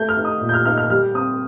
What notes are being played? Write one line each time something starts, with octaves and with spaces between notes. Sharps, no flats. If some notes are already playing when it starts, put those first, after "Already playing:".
Already playing: A3 G6
F6
D#4
D#6
A#2
G6
F6
D#4 F6
F6
G3 F6
C4 D#6